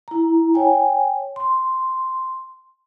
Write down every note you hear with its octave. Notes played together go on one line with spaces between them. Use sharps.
E4 A#5
C#5 G5 G#5
C6